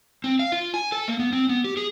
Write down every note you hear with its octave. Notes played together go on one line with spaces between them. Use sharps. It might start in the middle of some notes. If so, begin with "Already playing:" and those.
C4
F5
F4
G#5
A4
A#3
B3
C4
B3
G4
G#4